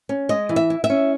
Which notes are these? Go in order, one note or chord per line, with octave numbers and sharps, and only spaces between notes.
C#4
G#3 D#5
E3
E5
E4
E5
C#4